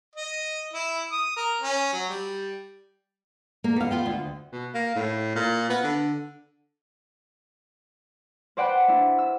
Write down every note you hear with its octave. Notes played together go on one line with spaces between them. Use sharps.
D#5
E4
D#6
A#4
C#4
F#3
G3
A#3
B3 F5
B3 F4 G5
D2
B2
A#3
A2
A#2
B3
D3
B4 C5 D5 F#5 G5 B5
D4 E4
E6